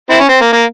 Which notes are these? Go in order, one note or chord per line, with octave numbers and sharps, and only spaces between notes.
C4 E4
C#4
C4
A#3
A#3